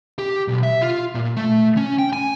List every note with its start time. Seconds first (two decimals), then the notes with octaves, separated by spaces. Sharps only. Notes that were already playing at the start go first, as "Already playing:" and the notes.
0.19 G4
0.48 B1
0.63 E5
0.82 F4
1.15 A#2
1.37 A3
1.77 C#4
1.99 G5
2.13 G#5